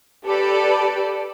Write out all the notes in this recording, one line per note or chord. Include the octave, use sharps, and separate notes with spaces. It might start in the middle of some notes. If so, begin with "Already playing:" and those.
G4 A4 B4 D5